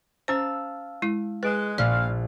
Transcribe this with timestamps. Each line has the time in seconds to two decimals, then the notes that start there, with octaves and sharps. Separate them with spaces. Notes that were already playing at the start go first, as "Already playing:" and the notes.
0.28 C#4 C5 F5 A5 E6
1.02 G#3 E4
1.43 G#3 B4 F#6 D7 E7
1.78 A#1 A#2 D5 F5